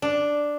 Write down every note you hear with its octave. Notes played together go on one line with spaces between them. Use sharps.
D4